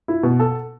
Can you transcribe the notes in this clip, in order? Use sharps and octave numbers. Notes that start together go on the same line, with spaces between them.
E4
B2
A4